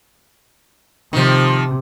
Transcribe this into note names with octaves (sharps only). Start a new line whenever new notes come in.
C3 D#3 F3